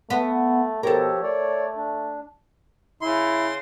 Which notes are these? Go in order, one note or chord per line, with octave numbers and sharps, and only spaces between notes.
A3 B3
B2 F3 G4 A4 A#4 C#5
A3 C#5 D5
D4
C#3 E4 C6